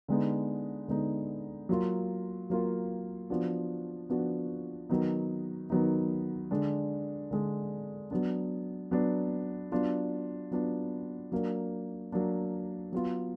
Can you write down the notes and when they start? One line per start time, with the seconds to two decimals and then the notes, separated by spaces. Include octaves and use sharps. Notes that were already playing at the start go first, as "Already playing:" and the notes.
0.08 D3 G#3 B3 D#4
0.88 D3 G#3 B3 D#4
1.69 F#3 A#3 F4
2.50 F#3 A#3 F4
3.30 F3 B3 D4 F#4
4.10 F3 B3 D4 F#4
4.90 D#3 F#3 B3 D#4
5.70 D#3 F#3 B3 D#4
6.51 D3 G#3 D4
7.31 D3 G#3 D4
8.11 F#3 B3 D4
8.91 F#3 B3 D4
9.72 F#3 B3 D4 F4
10.51 F#3 B3 D4 F4
11.32 F#3 A#3 D4
12.12 F#3 A#3 D4
12.92 F#3 B3 F4